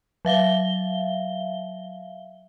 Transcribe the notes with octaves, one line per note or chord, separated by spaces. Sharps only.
F#3 E5 F5 G7